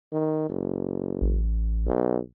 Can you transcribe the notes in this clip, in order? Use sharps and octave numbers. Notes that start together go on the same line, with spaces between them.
D#3
F#1
A1
B1